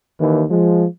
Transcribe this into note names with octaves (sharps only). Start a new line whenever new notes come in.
D#2 E3
F3 G#3